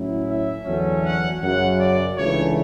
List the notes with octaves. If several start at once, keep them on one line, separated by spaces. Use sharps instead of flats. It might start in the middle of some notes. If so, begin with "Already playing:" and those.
Already playing: A2 F#3 C#4 E4
E5
E2 D3 F#3 A3 C#4
F#5
F#2 C#3 F#3 F#5
D5
C#2 C#3 E3 A3 D4 C#5